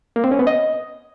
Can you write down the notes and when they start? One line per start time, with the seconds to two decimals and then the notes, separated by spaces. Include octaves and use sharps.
0.16 A#3
0.24 C4
0.31 C#4
0.39 B3
0.47 D#5